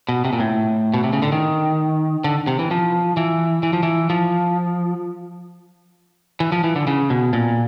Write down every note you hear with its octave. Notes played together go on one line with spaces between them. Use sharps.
B2
C3
A#2
A2
B2
C3
C#3
D3
D#3
D3
C3
E3
F3
E3
E3
F3
E3
F3
E3
F3
E3
D3
C#3
B2
A#2